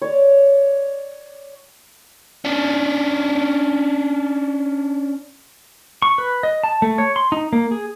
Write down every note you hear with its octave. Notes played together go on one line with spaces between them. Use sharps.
C#5 D5
C#4 D4
C#6
B4
D#5
A5
A3
C#5
C6
D#4
A#3
G#4